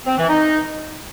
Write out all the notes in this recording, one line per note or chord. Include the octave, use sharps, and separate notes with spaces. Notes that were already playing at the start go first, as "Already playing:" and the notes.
C4
E3
D#4